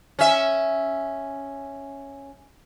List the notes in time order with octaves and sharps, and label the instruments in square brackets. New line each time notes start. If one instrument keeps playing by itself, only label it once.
[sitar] C#4 E5